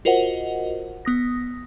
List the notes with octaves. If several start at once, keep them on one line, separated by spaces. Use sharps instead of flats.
F4 F#4 A#4 C5 D#5 F#5
B3 D#6 A#6